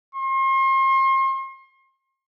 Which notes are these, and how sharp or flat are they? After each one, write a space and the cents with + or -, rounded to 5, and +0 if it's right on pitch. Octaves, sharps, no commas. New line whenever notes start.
C6 +40